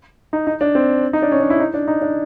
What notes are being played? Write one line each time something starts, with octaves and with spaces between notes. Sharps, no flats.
D#4
D#4
D4
C4
D#4
D4
C#4
D4
E4
D#4
D4
D#4
D4